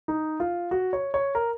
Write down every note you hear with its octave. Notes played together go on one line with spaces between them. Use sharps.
D#4
F4
F#4
C#5
C#5
A#4